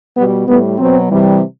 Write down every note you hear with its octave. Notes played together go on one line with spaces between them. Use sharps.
B2 G3 B3
A2 G3 B3
B2 F#3 C4
C3 E3 G3